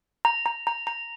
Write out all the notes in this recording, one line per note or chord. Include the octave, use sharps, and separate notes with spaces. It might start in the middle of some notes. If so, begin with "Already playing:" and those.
A#5
A#5
A#5
A#5